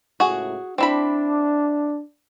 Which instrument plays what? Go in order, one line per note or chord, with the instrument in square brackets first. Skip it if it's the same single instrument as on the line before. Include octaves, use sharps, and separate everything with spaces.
[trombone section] C#2 A2 [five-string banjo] F#4 G#4
[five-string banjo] C4 E4 B5 [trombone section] D4